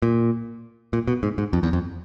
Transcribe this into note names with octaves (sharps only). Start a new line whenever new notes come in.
A#2
A#2
B2
G#2
G#2
F2
E2
F2